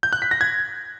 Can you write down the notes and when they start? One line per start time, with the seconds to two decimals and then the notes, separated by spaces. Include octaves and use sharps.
0.03 G6
0.13 F#6
0.22 B6
0.31 A#6
0.41 G#6